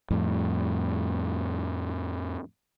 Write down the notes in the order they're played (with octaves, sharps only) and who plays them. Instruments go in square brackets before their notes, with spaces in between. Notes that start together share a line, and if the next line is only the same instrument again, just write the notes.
[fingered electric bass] F2 A2